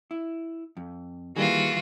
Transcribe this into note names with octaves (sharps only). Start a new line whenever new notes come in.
E4
F2
D#3 E3 G3 A#3 F4 F#4 G#4